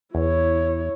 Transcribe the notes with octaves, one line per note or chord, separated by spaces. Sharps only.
E2 E4 C#5